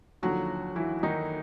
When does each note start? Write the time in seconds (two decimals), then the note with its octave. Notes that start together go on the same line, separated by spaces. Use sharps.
0.23 D#2 D3 F3 F#3 F#4
0.76 E3 E4
1.03 D#3 D#4